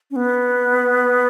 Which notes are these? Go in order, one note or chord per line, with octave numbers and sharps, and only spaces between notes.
C#4
B3